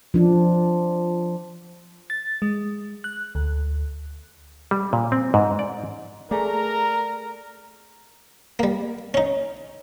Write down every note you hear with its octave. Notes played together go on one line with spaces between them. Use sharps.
F3 D4
A6
G#3
F#6
D2
G3
A#2
C4
G#2
D5
A3 G#4 A#4 D5 A#5
G3 A#3
C#4 D#4